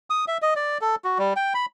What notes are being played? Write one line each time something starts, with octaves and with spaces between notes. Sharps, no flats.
D#6
E5
D#5
D5
A4
F#4
G3
G5
B5